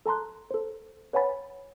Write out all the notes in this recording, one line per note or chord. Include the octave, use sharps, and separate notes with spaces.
A4 A5 A#5 C6 F#6
A4 C5
B4 C#5 F#5 G#5 B5 A6